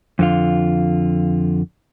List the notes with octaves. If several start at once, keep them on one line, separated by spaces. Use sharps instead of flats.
F2 D3 F4